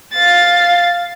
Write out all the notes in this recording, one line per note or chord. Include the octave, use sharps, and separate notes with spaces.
F5 A6